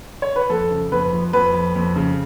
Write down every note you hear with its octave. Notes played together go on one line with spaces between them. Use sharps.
C#5
B4
F2 A4
C#3
F2 B4
F3
F2 B4
F2
F2
C#3